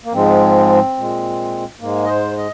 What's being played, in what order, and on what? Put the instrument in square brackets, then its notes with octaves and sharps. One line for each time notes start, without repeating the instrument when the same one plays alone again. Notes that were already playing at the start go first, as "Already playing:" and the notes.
[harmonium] A#3
G#2 F3 G#3 C4
A#2 G#3
G#2 G#3 A#3
D#5
C5
D#5